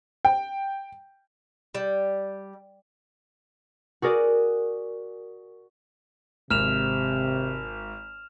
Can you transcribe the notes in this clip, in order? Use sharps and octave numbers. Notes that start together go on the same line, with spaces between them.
G5
G3
F#4 G#4 A#4 D5
G#1 C3 F6 E7 F7